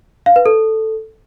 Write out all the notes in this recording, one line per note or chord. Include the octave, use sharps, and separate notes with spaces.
F5
B4
A4